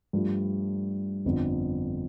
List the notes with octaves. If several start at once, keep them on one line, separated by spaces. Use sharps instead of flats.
G2 F3 A3 D4 F4
G1 F2 D3